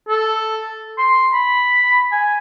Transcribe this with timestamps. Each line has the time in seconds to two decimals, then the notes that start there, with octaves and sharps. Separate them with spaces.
0.09 A4
0.98 C6
1.32 B5
2.11 G#5